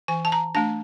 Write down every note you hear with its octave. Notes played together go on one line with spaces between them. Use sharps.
E3 G#5
A5
A#5
A3 D4 A5